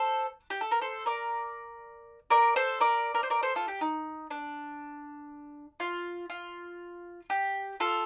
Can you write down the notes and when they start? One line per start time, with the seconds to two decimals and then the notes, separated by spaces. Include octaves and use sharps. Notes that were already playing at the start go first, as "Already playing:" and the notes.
Already playing: A4 C5
0.50 G4
0.61 A4
0.71 A#4
0.81 A4 C5
1.06 A#4 D5
2.30 A#4 D5
2.56 A4 C5
2.80 A#4 D5
3.15 A#4
3.23 C5
3.30 A#4 D5
3.43 A4 C5
3.56 F4 A4
3.68 G4
3.81 D#4
4.31 D4
5.80 F4
6.30 F4
7.30 G4
7.80 F4 A4